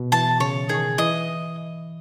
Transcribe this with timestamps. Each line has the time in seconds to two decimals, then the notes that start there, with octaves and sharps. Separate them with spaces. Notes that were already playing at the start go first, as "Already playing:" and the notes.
Already playing: B2
0.12 E3 A5
0.40 C#3 C#5
0.69 D#3 G#4
0.98 E3 D#5